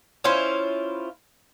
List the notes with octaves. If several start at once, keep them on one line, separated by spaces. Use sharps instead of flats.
C#4 E4 F4 C5